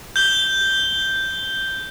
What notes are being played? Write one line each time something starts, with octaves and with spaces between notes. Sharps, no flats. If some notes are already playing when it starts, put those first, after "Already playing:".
G6 G7